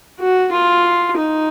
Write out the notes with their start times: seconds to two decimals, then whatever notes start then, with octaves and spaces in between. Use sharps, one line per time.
0.19 F#4
0.52 F4
1.17 D#4